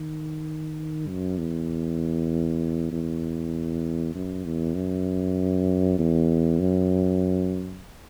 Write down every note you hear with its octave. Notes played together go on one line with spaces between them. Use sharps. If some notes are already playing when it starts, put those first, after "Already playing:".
Already playing: D#3
F#2
E2
E2
F#2
E2
F#2
E2
F#2